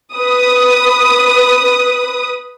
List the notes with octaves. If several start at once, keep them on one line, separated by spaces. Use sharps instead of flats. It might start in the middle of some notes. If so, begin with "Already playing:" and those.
B4 D#6